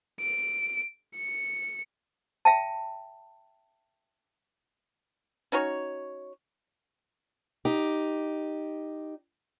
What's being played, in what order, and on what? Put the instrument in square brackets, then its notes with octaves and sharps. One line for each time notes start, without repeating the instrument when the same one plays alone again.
[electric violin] D7
C#7
[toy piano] E5 G5 A5
[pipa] C#4 D#4 F#4 C#5
[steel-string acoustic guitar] D#4 G4